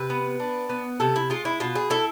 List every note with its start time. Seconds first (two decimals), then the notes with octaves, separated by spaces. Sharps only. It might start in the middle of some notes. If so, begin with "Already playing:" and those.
Already playing: C3 B4
0.10 B3
0.40 D4
0.69 B3
1.00 C3 A4
1.16 E4
1.30 G#3 F4
1.45 E4
1.60 B2 F4
1.75 G#4
1.90 E4 A4